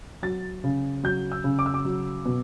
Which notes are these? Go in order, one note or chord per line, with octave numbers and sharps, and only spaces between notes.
F#3 A6
C#3
F#3 G6
E6
C#3
D6
E6
D6
F#3
B2